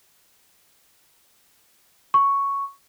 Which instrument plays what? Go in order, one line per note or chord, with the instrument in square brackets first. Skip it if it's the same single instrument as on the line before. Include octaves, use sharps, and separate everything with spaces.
[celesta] C#6